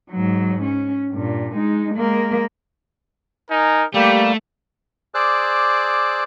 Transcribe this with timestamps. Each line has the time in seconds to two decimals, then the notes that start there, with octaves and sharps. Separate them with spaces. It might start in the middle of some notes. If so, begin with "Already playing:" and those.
0.10 G#2 F#3
0.63 C#4
1.12 G2 A#2
1.55 G#3 D#4
1.95 G#3 A#3
3.50 D#4 A#4 G#5
3.94 G3 A3 A#3 G4
5.14 G#4 C5 D5 D6 E6 F#6